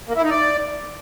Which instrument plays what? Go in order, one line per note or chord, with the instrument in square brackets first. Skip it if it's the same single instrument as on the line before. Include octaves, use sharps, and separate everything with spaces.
[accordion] A#3
E4
D#4
D5